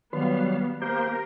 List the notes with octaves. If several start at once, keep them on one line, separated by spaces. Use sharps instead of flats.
D#3 F#3 G3 B3 F5
A#3 G4 A#4 C5